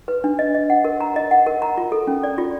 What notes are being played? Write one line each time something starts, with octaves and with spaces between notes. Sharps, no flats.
B4
D4
D#5
D#5
F#5
A#4
A#5
D#5
F#5
A#4
A#5
F4
A4
C#4
D5
F4